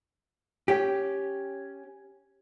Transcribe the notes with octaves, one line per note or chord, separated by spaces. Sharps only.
C#4 G4